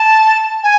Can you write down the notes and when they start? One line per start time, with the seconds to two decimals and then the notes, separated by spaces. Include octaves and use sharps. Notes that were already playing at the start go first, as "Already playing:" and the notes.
Already playing: A5
0.63 G#5